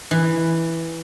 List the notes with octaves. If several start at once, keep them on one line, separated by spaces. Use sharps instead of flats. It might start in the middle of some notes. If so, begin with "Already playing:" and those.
E3